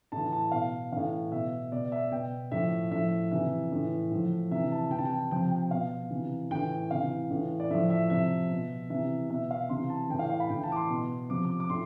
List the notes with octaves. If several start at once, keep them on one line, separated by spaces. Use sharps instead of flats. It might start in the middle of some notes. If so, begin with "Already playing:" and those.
A2 E3 A5
A5
B2 F5
A2 E3 F5
B2 E5
B2 D5
E5
B2 G5
A2 F3 E5
A2 F3 E5
C3 E3 E5
A2 E3
A2 F3
C3 E3 E5
A5
C3 E3 G5 A5
G5
C3 F3 G5
G5
B2 F5
C3 E3
A2 E3 G5
C3 E3 F5
A2 E3
D5
A2 F3 E5
E5
C3 F3 E5
B2
C3 E3 E5
B2 E5
F5
C3 E3 C6
A5
A2 E3 G5
F5
F5
B5
A2 E3 G5
A5
D6
C6
B2
C3 F3 D6
D6
D6
A2 C6